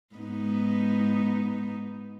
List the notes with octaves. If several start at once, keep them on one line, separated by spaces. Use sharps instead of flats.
G#2 B3 D#4